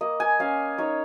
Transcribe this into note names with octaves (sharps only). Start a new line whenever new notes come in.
A#3 D#5
G#5
C#4 F5
D#4 C#5